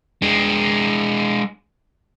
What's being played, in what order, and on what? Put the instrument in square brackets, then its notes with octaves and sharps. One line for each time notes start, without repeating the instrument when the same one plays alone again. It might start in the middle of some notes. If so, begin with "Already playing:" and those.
[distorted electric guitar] G#3 D4